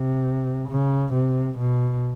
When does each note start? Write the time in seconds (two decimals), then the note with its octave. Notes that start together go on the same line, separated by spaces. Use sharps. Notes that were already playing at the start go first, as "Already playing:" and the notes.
Already playing: C3
0.69 C#3
1.13 C3
1.58 B2